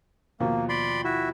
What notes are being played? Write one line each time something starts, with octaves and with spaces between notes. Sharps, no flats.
D#2 B2 F3 A#3
D5 B5 C6
E4 F#4 E5